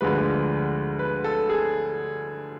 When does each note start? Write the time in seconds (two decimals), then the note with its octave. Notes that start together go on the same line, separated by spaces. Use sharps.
0.01 D2 D3 F3 G#3 B4
0.99 B4
1.24 A4
1.49 G#4